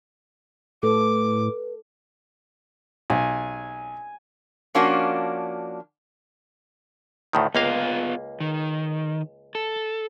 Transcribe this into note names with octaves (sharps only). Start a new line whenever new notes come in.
A2 A4 B4 D6
B1 G#5
F3 A#3 C#4 D4 F#4
D2 A2 D#3
C#2 A#3 B3 F4 F5
D#3
A4